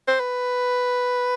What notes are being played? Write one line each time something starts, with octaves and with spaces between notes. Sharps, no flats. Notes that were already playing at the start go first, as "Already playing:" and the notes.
C5
B4